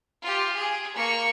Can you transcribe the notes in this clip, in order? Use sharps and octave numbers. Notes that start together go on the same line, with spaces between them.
F4 G4
G#4
A#3 C#6